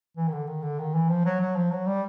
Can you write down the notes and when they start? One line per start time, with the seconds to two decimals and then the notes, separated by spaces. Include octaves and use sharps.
0.17 E3
0.28 D#3
0.32 D3
0.47 D#3
0.62 D3
0.79 D#3
0.94 E3
1.09 F3
1.25 F#3
1.41 F#3
1.56 F3
1.71 F#3
1.86 G3